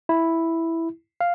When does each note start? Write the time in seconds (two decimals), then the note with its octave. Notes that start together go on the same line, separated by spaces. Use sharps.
0.09 E4
1.21 F5